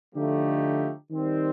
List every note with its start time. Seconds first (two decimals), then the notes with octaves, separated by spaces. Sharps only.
0.15 D3 F3 A3 D#4 G4
1.11 D#3 G3 C4